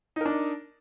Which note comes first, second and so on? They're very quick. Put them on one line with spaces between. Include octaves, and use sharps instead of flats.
D#4 A#4 D4